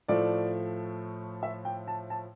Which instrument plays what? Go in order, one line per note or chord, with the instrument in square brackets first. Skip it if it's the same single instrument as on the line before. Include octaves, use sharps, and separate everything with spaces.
[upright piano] A2 F3 A3 D5
E5
G5
A5
A5